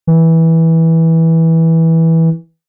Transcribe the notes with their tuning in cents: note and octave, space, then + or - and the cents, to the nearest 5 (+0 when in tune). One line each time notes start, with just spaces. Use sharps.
E3 -15